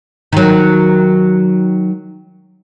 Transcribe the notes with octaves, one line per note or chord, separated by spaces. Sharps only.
D#3 F#3